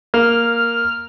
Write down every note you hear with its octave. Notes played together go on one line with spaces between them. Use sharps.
A#3 F6